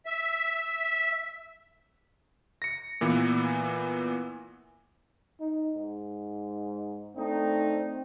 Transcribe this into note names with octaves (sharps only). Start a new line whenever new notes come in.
E5
A#6 C#7
A#2 E3 B3
D#4
G#2
A3 C4 D4 D#4